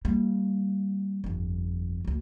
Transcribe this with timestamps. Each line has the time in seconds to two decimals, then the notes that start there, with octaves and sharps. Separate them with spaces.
0.05 G3 A#3
1.24 G1 F2
2.05 F#1 D2